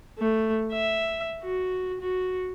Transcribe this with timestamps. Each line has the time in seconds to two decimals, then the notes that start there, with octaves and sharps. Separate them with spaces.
0.19 A3
0.72 E5
1.43 F#4
2.01 F#4